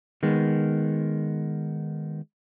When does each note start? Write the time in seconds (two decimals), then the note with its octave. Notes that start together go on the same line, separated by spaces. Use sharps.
0.23 D#3 G#3 B3